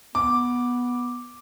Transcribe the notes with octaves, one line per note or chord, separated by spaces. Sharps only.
B3 D6